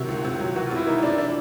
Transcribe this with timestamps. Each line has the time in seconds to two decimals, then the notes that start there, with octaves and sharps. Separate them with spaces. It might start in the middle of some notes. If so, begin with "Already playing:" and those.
Already playing: C3 D#3 F#3 F#4
0.08 C#2
0.24 C3
0.40 F#3
0.56 E3 F#4
0.66 F4
0.71 C3
0.76 E4
0.87 E3 D#4
1.02 C3 D4
1.18 D4